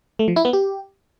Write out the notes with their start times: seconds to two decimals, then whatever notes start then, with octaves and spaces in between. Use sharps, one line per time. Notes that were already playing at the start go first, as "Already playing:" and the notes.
0.19 A3
0.28 F3
0.36 E4
0.45 B3
0.53 G4